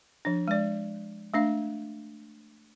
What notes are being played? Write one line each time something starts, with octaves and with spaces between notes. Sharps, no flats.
F3 D4
G#3 D5
A3 D4 F5